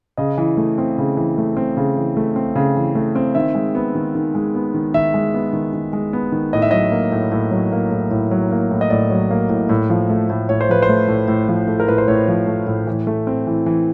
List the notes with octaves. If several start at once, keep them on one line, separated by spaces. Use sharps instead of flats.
C#3 D#5
E3
A3
C4
C#3
E3
A3
C4
C#3
E3
A3
C4
C#3
E3
A3
C4
D#3 E5
G#3
B3
D#3
D#3
G#3
B3
D#3
D#3 E5
G#3
B3
D#3
D#3
G#3
B3
D#3
A2 D#5
E5
F#3 D#5
A#3
A2
A2
F#3
A#3
A2
A2
F#3
A#3
A2
D#5
A2 D5
F#3
A#3
A2
A2
F3
A3
A2
A2 C#5
C5
F3 B4
C5
A3
A2
A2
F3
A3
A#4
A2 B4
C5
A2 C#5
F3
A3
A2
E3
A3
C4
E3
E3